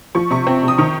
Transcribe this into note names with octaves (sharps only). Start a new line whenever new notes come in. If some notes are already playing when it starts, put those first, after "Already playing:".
F3 C#6
C3 C#6
C4
C3
D#6
D#3 C#6